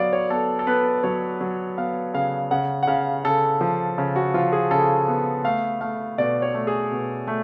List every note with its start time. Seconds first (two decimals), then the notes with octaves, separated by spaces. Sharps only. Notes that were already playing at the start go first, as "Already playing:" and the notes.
Already playing: F#3 B3 D5 F5
0.13 C#5
0.30 B3 A4
0.59 A4
0.67 B3 B4
1.03 F#3 C#5
1.41 F#3
1.78 B3 F5
2.14 C#3 F5
2.51 C#3 F#5
2.83 F#5
2.87 C#3 F5
3.24 C#3 A4
3.61 F3
3.98 C#3
4.16 F#4
4.34 F3 F4
4.52 G#4
4.71 C#3 A4
5.08 B3
5.44 A3 F5
5.81 A3 F5
6.18 B2 D5
6.42 C#5
6.54 A3
6.67 G#4
6.92 B2
7.27 A3